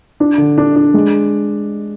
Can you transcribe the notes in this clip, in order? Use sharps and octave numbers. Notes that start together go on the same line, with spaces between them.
D4
D3
D4
D4
G#3